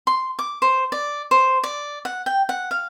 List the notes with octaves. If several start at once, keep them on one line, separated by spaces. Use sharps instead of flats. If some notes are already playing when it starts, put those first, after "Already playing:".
C6
D6
C5
D5
C5
D5
F#5
G5
F#5
F5